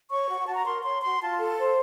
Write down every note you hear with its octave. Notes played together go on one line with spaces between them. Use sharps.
C#5 C#6
F#4
F#5
F#4 A5
A#5
A#4 C6
C#5 C6
F#4 C6
F4 A5
A4
C5